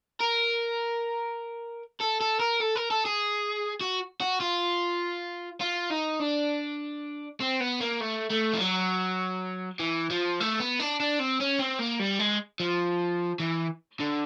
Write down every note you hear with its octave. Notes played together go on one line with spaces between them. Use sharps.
A#4
A4
A4
A#4
A4
A#4
A4
G#4
F#4
F#4
F4
F4
D#4
D4
C4
B3
A#3
A3
A3
F3
F#3
E3
F3
A3
B3
D4
D4
C4
C#4
C4
A#3
G3
G#3
F3
E3
D3